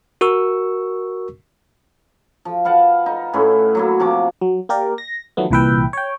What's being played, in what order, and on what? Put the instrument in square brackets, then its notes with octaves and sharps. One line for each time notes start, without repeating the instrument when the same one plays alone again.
[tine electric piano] F#4 A#4 C#6 E6
[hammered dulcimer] F3
B4 F5 F#5 A5
D#4
A2 C#4 E4 B4
F#3 A#3 E4
C3 F3 F#4 D6
[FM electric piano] F#3
A#3 G4 A#4 D5
A#6
D#3 F3 F#3 A3 B3
C2 A#2 E3 B4 E5 G5
C#5 G5